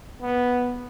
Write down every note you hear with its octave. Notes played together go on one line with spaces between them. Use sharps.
B3